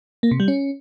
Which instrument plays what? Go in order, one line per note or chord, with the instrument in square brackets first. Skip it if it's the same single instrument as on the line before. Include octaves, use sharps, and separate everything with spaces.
[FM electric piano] A#3
C3
G3
C#4